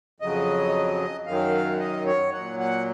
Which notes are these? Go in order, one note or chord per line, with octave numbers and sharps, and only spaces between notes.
F2 C#3 F#3 D#5
F#2 D#3 F#3 F5
D#5
C#5
A#2 F#3 F#5
F#5